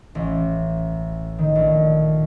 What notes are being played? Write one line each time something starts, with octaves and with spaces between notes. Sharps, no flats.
A1
D#3
A#1